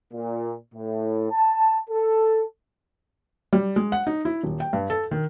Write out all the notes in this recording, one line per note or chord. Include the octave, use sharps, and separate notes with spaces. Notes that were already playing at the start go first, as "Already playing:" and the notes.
A#2
A2
A5
A4
G3
G#3
F#5
D#4
E4
D#1
G5
G2
A4
D#3